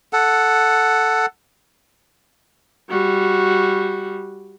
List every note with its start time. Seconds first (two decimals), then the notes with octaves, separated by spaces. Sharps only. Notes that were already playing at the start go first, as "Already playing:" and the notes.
0.13 A4 F#5
2.90 G3 F#4